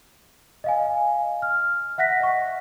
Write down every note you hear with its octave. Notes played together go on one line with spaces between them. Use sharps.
D#5 F5 G#5
F6
E5 F#5 F#6 A#6 B6
D#5 C#6